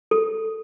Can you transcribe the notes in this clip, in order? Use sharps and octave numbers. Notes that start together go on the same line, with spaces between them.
A4